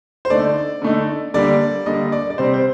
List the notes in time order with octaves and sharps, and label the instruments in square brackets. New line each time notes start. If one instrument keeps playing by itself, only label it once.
[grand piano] C5
D3 A3 D#4 D5
D3 A3 D#4
D3 G3 A#3 D5
D3 G3 A#3 D#5
D5
D5
C3 G3 C4 C5
C5